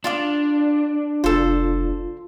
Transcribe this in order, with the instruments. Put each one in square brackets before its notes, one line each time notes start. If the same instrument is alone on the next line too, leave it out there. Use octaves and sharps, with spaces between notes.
[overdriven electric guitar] D4 [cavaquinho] F4 F5 D6
[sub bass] F1 [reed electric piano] F4 [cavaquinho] A4 C5